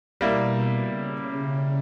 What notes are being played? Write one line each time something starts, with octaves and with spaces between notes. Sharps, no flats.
B2 G3 A#3 E4
C#3